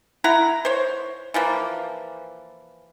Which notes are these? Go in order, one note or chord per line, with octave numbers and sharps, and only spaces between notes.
E4 F#5 A#5
C5 C#5
E3 F3 A#3